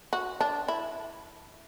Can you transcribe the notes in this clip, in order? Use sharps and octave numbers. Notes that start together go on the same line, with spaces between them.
F#4
D4
E4